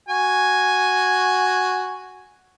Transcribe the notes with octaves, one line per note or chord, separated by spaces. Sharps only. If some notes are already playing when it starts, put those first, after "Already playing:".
F#4 G#5